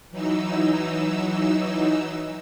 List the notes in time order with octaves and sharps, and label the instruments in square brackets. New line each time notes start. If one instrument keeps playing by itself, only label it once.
[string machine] E3 F#3 D#4 E6